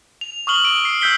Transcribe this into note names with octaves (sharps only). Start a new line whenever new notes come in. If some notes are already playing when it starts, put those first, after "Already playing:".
F7
C#6 D#6 F6 F#7 G7
E6 D7
C7
E6 F#6 G6 B6 G7